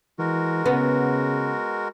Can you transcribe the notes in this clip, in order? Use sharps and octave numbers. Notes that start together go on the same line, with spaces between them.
E3 G#3 F#4 A#4
C#3 B3